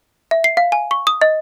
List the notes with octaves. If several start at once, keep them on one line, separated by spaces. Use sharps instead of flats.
E5
C7
F5
G#5
C#6
D#6
D#5